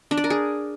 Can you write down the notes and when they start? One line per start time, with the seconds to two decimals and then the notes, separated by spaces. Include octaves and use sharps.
0.11 D4
0.17 D5
0.24 A#4
0.30 G#4